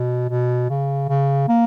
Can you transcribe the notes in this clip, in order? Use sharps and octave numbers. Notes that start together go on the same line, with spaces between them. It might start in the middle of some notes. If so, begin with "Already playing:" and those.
Already playing: B2
B2
C#3
C#3
A#3